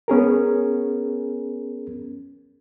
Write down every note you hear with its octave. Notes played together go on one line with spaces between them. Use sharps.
B3 C#4 G#4 A#4